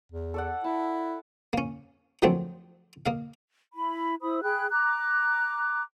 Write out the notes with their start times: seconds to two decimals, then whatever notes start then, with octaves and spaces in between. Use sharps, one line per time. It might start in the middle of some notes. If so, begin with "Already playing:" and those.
0.12 E2
0.34 A4 D5 F#5
0.64 E4 A5
1.53 A#3 C#4
2.22 D#3 F3 F#3 A3 C4 D4
3.06 A#3 D#5 F5
3.74 E4 B5
4.21 E4 C5 B5 D#6
4.43 G#4 G5 B5 F#6
4.71 A#5 D6 F#6